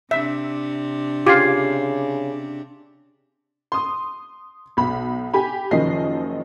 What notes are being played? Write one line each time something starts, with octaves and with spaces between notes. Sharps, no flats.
C3 D4 E5
C#3 F4 G4 D6 G#6 C7
C6 D#6
B1 B5
G4 G#5 B5
F#1 F#2 D#3 F3 D#5 C7